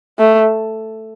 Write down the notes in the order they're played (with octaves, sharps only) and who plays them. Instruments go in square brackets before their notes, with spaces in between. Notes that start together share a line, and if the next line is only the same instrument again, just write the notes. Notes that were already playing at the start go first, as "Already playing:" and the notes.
[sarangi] A3